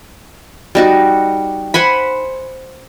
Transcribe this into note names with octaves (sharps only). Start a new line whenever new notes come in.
G3 D#4 F#4
C5 F#5 G#5 B5